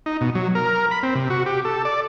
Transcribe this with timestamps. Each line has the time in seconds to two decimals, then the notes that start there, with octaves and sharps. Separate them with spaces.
0.06 D#4
0.21 B2
0.35 F#3
0.55 A#4
0.91 B5
1.03 C4
1.15 C3
1.30 F#4
1.46 G4
1.65 A4
1.85 D5